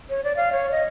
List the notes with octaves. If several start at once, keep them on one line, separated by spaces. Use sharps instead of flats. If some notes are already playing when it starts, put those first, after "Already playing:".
C#5
D5
F5
C#5
D#5